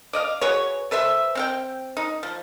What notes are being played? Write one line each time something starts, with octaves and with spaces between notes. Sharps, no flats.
D5 D#5 F5
F#4 G#4 B4 C#5
A4 B4 C5 E5
C4 F5 G5
D#4
F3